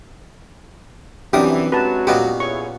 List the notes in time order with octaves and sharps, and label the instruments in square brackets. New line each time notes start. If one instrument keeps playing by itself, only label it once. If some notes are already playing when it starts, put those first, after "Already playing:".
[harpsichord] F#2 C3 D#6 [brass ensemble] E3 [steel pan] D4 G4
[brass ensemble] F#3 G#3 F#4 [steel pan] B4 A5
[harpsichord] A#2 B3 C#4 [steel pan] G4 D#5
[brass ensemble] E4 G#4 C#5 [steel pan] C#6